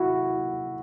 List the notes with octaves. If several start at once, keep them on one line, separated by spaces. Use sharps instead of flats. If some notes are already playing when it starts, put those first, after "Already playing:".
Already playing: E4 F#4